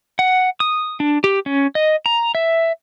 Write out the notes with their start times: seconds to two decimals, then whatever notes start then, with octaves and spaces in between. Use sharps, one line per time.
0.19 F#5
0.60 D#6
1.00 D4
1.24 G4
1.46 C#4
1.75 D#5
2.06 A#5
2.35 E5